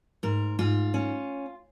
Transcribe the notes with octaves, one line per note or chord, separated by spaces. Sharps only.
G#2 A#4
G#2 F4
C#4